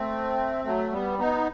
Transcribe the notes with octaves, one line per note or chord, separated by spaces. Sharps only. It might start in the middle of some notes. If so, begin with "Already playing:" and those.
Already playing: A3 C4
F#3 A3
G3 B3
B3 D#4